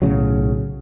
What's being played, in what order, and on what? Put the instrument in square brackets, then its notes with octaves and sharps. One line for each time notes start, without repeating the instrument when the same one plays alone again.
[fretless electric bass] B1 A2 C#3 F#3